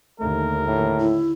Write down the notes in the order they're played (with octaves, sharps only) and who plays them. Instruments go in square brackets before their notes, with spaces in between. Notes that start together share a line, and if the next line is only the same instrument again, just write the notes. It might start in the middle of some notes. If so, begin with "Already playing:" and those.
[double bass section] D#2 D3 [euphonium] A3 [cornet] A#4
[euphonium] A2
[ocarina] E4